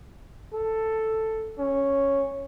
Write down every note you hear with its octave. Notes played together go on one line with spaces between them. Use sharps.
A4
C#4